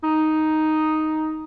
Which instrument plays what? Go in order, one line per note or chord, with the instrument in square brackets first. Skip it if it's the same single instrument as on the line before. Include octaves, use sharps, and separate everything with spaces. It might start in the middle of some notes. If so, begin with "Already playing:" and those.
[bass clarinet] D#4